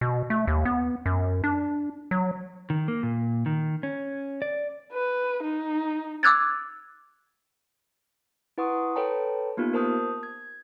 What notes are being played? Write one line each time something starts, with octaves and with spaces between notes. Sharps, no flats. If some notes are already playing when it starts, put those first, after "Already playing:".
B2
A3
D#2
B3
F#2
D4
F#3
D#3
A#3
A#2
D#3
C#4
D5
B4
D#4
D6 E6 F#6 G#6 A6
E4 B4 F#5 C6 C#6 D#6
A4 B4 C#5 G5 A5 A#5
A#3 B3 D#4 F4 G4
A#4 C5 A5 D#6 G6
G#6